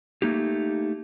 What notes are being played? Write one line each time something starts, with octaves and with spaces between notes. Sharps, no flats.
A3 A#3 D#4 G4